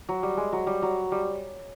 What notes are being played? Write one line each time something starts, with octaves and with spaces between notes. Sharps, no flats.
F#3
G3
G#3
F#3
G3
F#3
G3